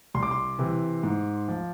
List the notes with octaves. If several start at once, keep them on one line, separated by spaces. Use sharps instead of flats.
C2 C6
D6
C6
C3 E3
G#2
F3